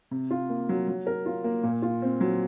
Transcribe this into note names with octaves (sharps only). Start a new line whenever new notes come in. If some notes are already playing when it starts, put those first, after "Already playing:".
C3
F4
A#3
F#3
F#3
A#4
F4
A#3
A#2
F4
C4
F#3